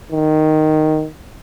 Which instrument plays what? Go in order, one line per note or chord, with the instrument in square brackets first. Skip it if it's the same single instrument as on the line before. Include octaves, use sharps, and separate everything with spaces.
[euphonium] D#3